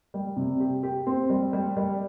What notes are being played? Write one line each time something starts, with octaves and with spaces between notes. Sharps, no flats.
G3
C3
G4
G4
C4
G3
G3
G3